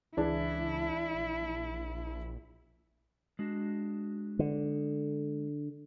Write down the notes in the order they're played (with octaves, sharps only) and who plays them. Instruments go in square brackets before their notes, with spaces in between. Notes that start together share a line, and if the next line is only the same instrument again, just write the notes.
[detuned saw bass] C#2 [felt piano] E3 D4 G#4 [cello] E4
[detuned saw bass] A#1
[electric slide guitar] G#3 D4 F#4
[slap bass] D3